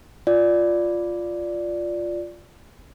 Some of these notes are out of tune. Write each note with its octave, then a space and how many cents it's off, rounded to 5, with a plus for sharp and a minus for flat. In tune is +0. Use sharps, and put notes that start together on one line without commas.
F4 +0 D5 +0